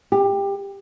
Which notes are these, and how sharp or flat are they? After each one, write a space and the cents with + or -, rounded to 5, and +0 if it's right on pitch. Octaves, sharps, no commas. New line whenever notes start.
G4 +20